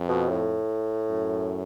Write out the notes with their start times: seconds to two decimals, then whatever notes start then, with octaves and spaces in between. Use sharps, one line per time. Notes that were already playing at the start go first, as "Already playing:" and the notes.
Already playing: F2
0.08 B2
0.29 A2
1.11 F#2